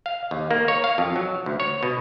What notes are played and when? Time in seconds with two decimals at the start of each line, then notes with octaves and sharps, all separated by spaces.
0.06 F5
0.31 D#2
0.51 A#3
0.68 C#5
0.84 F5
0.98 F2
1.16 F#3
1.46 D2
1.60 C#5
1.83 B2